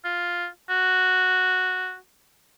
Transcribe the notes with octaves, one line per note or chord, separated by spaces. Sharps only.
F4
F#4